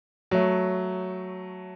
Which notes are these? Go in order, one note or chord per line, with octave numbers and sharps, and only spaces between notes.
F#3 A3